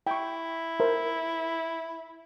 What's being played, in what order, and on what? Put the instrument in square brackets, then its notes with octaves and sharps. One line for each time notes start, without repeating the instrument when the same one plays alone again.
[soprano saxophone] E4 [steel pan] G5 C#6
[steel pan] A#4 C5 E5